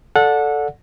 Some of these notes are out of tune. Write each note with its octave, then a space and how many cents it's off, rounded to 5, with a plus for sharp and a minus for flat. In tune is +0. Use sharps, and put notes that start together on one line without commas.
A4 +0 D5 -5 F#5 -25